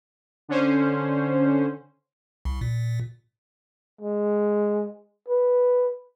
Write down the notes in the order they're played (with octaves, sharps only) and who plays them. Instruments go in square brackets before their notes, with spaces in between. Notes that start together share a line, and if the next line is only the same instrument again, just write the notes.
[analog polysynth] D3 C#4 C5
[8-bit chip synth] C2
A#2
[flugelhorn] G#3
B4